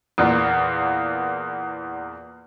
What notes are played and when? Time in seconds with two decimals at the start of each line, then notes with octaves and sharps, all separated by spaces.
0.18 E2 A#2 A#3